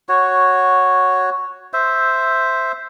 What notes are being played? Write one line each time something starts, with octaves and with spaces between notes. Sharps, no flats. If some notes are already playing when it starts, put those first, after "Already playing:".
F#4 C#5
C5 E5